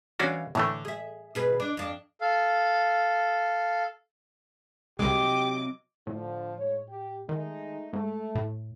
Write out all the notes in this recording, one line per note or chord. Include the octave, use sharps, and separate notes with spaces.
E3 C#4 D4 F#4 F5
A2 D3 E3 A3
G#4 E5
B2 G#4 B4
D4
F2 D4
A4 F5
C2 C3 F#3 G#3 G4 D#5 D6
A2 D3 F3
G#2 C#5
G4
D#3 G#3 A3 D#4
G#2 A3
A2